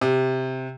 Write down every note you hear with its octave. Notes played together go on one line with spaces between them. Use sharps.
C3